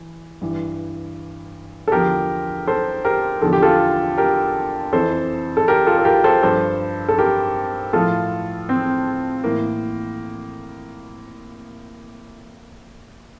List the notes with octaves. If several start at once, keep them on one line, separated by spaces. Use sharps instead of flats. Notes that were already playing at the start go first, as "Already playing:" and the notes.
Already playing: E3
G2 E3
A4
E2 D3 F3 G4 A#4
A4 C5
G4 A#4
E2 D3 F3 A4
G4
F4 A4
G4 A#4
F2 E3 A4 C5
A4
G4 A#4
F4 A4
A4
G4 A#4
A4 C5
G2 F3 A4 C5
A4
G4 A#4
A2 F3 F4 A4
C4
A2 E3 A#3